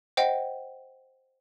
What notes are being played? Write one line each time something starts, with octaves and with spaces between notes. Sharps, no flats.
C5 D#5 F#5 G5